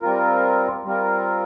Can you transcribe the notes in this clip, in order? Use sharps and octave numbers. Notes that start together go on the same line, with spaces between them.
G3 C4 F4 A#4
G3 C4 F4 A#4